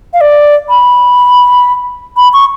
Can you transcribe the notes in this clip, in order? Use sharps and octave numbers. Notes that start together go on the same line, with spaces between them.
F5
D5
B5
B5
C#6